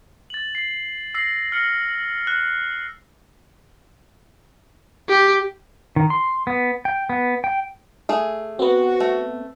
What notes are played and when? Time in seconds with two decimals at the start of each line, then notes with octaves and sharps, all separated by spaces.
0.30 A6 F#7
0.55 C7
1.15 E6 A#6 C7
1.52 F6 A#6 C#7
2.27 F#6
5.09 G4
5.96 D#3
6.10 C6
6.47 B3
6.85 G5
7.10 B3
7.44 G5
8.09 A3 G#4
8.59 B3 C4 F#4
9.00 A3